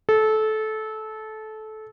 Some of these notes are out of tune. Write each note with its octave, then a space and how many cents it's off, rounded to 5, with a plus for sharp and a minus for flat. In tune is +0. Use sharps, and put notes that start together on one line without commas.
A4 -20